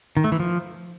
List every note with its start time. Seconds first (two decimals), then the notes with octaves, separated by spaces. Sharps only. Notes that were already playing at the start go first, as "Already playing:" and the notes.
0.17 D#3
0.24 A3
0.32 E3
0.40 F3